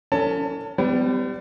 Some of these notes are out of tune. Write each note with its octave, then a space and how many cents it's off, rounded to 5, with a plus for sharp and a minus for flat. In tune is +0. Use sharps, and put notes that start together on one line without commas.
C#4 +30 A4 +40 A5 +30
G3 +0 B3 +45